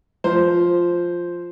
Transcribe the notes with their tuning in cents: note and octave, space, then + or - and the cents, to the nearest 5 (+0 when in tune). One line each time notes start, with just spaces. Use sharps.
F3 +0 C5 +0